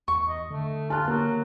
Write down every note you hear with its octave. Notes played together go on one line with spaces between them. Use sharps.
E2 C#6
D#5
D3 A3
F4 A5 F#6
F#3 A#3